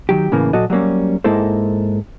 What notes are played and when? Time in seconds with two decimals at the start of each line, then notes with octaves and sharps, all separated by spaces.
0.09 D#3 F#3 G4
0.32 A2 C#3 E3 A#3
0.53 A#2 F#3 F#4 A4 D#5
0.70 F#3 G3 A#3 C#4
1.24 G#2 G#3 A#3 E4 A4 C5